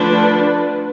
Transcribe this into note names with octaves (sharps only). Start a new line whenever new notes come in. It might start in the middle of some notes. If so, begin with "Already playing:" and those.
Already playing: D3 F3 A3 D4 B4